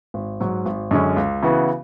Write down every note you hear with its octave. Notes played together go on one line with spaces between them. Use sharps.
G#1
G#2 F#3
G#1
F#2 D3 G#3 C#4
C#2
C#3 E3 B3 F#4